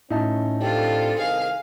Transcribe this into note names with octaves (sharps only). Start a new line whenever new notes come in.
A2 C#4 D#4 E5 A5
C4 D4 F4 G4 A4
C2 C3 D#3 G#4 F5